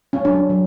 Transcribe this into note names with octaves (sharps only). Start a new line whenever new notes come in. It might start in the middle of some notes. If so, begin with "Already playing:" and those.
C#4
F#3 D4
F#3